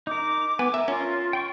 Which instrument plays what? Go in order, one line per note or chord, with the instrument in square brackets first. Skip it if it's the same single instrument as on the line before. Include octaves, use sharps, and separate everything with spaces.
[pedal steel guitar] D#4 A#4 [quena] D6
[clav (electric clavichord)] B3 [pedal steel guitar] G#5
[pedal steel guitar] A#4 [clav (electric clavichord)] E5
[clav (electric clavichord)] C#4 [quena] F4
[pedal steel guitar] G5 C6 C#6